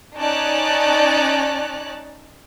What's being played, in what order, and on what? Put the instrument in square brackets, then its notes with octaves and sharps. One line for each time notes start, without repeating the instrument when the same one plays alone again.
[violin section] C#4 D#4 C#5 D5 A5 F#6